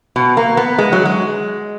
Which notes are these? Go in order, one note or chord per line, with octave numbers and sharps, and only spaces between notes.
B2
A#3
B3
G#3
F#3
G#3